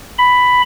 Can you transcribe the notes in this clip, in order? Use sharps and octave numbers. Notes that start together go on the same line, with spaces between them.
B5